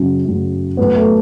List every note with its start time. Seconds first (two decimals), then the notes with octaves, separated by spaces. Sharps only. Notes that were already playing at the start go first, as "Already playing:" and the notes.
Already playing: F#2 C#3 F#3
0.25 F#2 C#3 F#3
0.77 A2 F#3 B3
0.95 A3